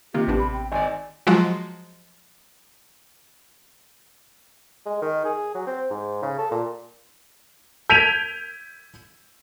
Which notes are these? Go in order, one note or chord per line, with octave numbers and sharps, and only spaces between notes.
C3 D#3 A#3 F4 G4
A1 B3 D4
B5
G5
G#1 D5 G#5
F3 F#3 G#3 F4 F#4
G#3
D#3
G#4
F#3
C4
G#2
C#3
A4
A#2
G6 G#6 B6 D7 D#7 F7